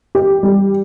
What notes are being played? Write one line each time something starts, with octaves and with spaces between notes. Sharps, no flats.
G4
G3